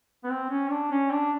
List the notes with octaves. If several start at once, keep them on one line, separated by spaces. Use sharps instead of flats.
B3
C4
C#4
D4
C#4
D4